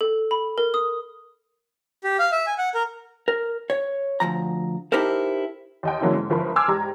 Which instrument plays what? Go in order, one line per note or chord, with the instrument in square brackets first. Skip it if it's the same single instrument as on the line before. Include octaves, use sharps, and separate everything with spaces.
[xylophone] A4
B5
A#4
D#6
[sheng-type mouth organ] G4
F5
E5
G#5
F#5
A#4
[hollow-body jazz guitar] A#4
C#5
D2 G2 F3 A#5
D#4 E4 G4 A4 A#4 C5
[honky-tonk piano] D#2 D#5 G5
G#2 D3 F#3 A#3 C#4 E4
G#2
G1 F3 A#4 B5
G#5 C6 D6 E6 F6 G#6
G#2 G3 A#5